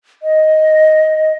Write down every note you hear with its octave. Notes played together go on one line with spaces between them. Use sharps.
D#5